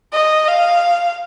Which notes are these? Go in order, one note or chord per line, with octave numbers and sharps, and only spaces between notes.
D#5
F5